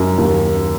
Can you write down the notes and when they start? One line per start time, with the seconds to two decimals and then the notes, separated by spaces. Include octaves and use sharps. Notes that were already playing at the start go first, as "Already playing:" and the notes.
Already playing: F#2
0.18 D#2